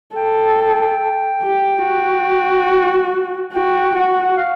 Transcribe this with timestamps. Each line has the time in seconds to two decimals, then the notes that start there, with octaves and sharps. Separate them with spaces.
0.15 A4 G5
1.43 G4
1.85 F#4
3.53 F#4 G5
3.95 F#4 F#5
4.37 F5